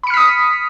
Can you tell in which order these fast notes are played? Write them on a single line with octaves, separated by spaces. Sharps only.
B5 C#7 F6 B6 D#6